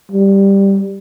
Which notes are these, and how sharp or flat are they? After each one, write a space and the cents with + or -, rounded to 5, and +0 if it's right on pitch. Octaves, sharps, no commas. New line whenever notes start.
G3 +5